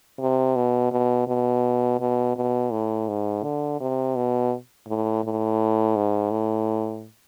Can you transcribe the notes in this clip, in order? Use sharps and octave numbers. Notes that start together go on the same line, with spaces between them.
C3
B2
B2
B2
B2
B2
A2
G#2
D3
C3
B2
A2
A2
G#2
A2